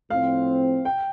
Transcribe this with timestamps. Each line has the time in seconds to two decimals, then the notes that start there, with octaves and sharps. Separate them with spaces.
0.10 A2 F3 C4 F5
0.85 G5